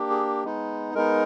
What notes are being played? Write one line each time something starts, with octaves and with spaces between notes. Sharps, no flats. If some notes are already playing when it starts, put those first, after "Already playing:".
Already playing: A#3 D4 G4
G#4
G#3 B3 D#4
G#3 B3 D#4 A#4